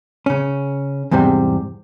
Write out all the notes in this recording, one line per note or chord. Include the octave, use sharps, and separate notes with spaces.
C#3 C#4
E2 G#2 C3 G3 C4